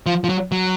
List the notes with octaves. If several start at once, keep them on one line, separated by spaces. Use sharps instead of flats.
F3
F3
F#3
F#3